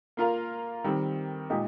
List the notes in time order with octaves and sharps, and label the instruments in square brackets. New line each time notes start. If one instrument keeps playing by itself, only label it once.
[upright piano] A#3 F4 A#4 F5
D#3 G3 C4
A#2 G#3 D#4 G4